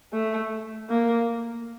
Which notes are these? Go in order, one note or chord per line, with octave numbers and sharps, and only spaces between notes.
A3
A#3